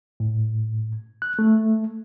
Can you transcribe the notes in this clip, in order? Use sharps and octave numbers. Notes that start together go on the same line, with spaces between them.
A2
F#6
A3